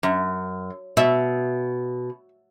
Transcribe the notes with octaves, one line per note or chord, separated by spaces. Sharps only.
F#2
B2 E5